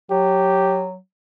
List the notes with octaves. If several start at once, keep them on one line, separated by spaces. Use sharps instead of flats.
F#3 G4